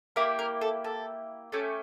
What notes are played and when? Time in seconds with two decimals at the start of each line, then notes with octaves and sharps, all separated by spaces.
0.16 A#3 E4 G4 A#4
0.39 A#4
0.61 A4
0.84 A4
1.52 A3 C#4 G4 A4